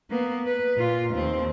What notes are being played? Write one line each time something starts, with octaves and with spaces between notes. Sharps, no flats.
A#3 B3
B4
A#2 F4
D#2 C4